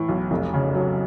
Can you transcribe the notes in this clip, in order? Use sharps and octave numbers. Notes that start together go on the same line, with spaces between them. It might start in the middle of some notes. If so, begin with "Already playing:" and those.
Already playing: A2 E3
B1
F1
C#3
F#3